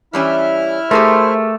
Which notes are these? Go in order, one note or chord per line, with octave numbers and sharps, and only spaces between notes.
E3 G3 C#4 E4 E5 F6
A3 G4 G#4 A#4 C5